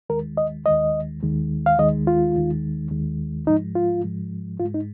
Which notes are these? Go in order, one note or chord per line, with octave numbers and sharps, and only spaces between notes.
D#2 D#3 G#3 A#4
D#5
D#2 D#3 G#3 D#5
D#2 D#3 G#3
F5
D#2 D#3 G#3 D#5
F4
D#2 D#3 G#3
D#2 D#3 G#3
G#2 F3 G#3 D#4
F4
G#2 F3 G#3
G#2 G#3 F4
D#4